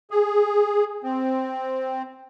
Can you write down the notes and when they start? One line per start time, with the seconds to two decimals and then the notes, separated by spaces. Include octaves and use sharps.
0.11 G#4
1.04 C4